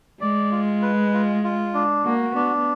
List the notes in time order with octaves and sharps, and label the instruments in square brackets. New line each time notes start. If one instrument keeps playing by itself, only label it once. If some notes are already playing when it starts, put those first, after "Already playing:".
[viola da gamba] G#3 [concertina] D5
[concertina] F4
B4
F4
F4
D4
[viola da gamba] A#3 [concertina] F#4
[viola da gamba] B3 [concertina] D4